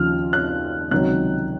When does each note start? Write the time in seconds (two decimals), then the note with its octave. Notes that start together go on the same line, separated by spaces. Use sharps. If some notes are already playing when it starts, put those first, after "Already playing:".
Already playing: D#2 C#3 F3 F6
0.33 F#6
0.91 C#2 C3 D#3 F#3 F#6